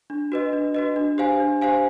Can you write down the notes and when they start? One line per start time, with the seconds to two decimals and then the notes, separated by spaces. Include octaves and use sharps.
0.10 D4
0.32 F#4 B4 D#5
0.53 D4
0.75 F#4 B4 D#5
0.96 D4
1.18 G4 C5 F5 G#5
1.40 D4
1.61 G4 C5 F5 G#5